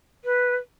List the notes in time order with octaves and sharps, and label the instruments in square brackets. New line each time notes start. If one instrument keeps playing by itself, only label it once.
[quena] B4